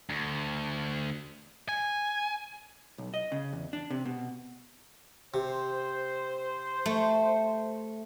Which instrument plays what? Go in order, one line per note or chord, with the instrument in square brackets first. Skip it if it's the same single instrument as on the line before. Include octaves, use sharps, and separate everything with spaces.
[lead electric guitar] D2
G#5
[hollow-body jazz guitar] B1
D#5
C#3
E2
D4
C3
B2
[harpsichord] C3 [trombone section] C5
[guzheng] A3